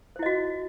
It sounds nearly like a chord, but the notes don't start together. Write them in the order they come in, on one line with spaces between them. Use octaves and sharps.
C5 E4 D#5 F#4